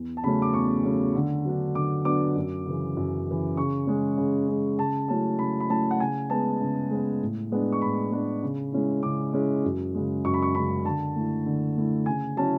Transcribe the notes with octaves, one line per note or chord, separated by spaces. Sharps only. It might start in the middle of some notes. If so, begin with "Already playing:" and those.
Already playing: E2
A5
C#3 F#3 A3 C#4 B5
D6
E2 C#6
C#3 F#3 A3 C#4
D3
F#3 B3 D4
D3 D6
F#3 B3 D4 D6
F#2
C#3 E3
F#2
C#3 E3
C#3 C#6
G#3 C#4
C#3
G#3 C#4
C#3 A5
F#3 A3 C#4 E4 A5
C#3 B5
B5
F#3 A3 C#4 E4 A5
F#5
C#3 G#5
G#3 B3 A5
C#3
G#3 B3
A2
G#3 B3 D4
C#6
A2 B5
G#3 B3 D4
C#3
G#3 C#4 E4
C#3 D6
G#3 C#4 E4
F#2
C#3 G#3
F#2 C#6
B5
C#6
C#3 G#3 B5
D3 A5
A3 E4
D3
A3 E4
C#3 G#5
F#3 C#4 E4 A5